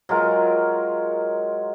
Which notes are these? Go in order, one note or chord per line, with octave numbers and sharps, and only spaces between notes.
F#3 G#3 F4 A#4